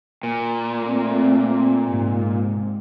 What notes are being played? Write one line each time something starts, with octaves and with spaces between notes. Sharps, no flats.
A#2
A3 C4
G#2 C3